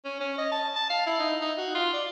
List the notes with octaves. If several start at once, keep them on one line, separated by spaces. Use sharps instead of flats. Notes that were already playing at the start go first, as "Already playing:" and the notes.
C#4
C#4
D#5
A5
A5
F5
E4
D#4
D#4
F#4
F4
D5